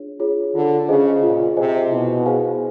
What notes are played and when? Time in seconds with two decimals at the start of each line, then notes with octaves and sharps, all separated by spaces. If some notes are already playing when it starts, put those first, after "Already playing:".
Already playing: D4 F4 G#4 C#5
0.20 F4 G#4 C#5
0.55 D3 F4
0.88 C#3 G#4 C5 D#5 G#5
1.23 A#2 F4
1.57 C3 G#4 C5 D#5 G#5
1.91 B2 E4
2.26 G#4 C5 F5 G#5